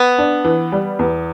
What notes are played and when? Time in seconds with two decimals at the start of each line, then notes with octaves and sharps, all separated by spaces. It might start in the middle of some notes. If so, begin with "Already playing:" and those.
Already playing: B3
0.18 D4
0.44 E3
0.72 G3
0.99 E2